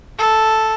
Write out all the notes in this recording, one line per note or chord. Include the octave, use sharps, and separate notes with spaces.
A4